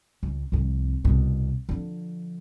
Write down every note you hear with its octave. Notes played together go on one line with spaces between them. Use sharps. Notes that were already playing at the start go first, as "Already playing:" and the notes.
C#2
C2 F2
C2 B2
D3 F3